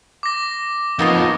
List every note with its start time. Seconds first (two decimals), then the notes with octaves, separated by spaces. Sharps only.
0.23 D6 A#6
0.99 F2 F3 A#3 B3 D#4 F4 C#5 D#5